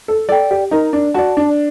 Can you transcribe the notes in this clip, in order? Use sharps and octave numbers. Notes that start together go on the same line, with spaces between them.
A4
A4 D5 G5
G4
D#4 A#4
D4
F#4 D5 A5
D4